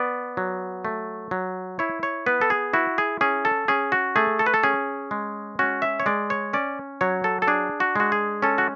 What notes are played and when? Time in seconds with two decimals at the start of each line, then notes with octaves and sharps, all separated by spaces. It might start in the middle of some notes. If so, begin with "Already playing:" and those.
Already playing: B3 D5
0.37 F#3
0.85 A3
1.31 F#3
1.79 E4 C#5
2.03 C#5
2.26 B3 B4
2.41 A4
2.50 G#4
2.73 E4 F#4
2.98 G#4
3.21 C#4 G#4
3.45 A4
3.68 C#4 G#4
3.92 F#4
4.16 A3 G#4
4.39 A4
4.46 B4
4.54 A4
4.63 C#4 G#4
5.11 G#3
5.59 C#4 F#4
5.82 E5
6.00 C#5
6.06 G#3 D5
6.30 C#5
6.53 C#4 D5
7.01 F#3 C#5
7.24 A4
7.42 A4
7.48 D4 G#4
7.80 F#4
7.96 G#3 F#4
8.12 G#4
8.42 C#4 A4
8.58 F#4